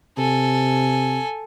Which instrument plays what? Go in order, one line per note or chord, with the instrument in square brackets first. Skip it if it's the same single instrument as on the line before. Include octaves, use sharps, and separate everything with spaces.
[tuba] C3 [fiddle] A4 G#5